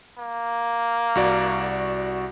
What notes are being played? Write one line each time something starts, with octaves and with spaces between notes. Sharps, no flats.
A#3
C2 F#4 D5